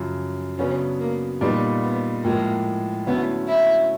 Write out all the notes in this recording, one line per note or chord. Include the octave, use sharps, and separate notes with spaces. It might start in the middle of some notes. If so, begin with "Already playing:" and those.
Already playing: F#2 C#3 F3
C#3 F#3 B3 C#4 D4
A#3
A#2 G3 B3 D#4
B3
A2 F3 G#3 A#3
D3 F#3 A3 B3 C#4 E4
E4